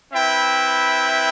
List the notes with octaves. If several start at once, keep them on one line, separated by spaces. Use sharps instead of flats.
C4 E4 B4 E5 G5